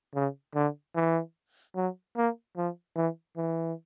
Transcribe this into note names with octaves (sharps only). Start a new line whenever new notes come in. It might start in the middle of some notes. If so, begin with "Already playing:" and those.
C#3
D3
E3
F#3
A#3
F3
E3
E3